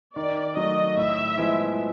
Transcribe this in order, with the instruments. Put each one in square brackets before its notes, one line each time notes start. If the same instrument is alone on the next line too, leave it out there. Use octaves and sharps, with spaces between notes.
[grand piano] D#3 [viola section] D5
[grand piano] F#3 A3 [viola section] D#5
[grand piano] A2 [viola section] E5
[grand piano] F3 G#3 B3 E4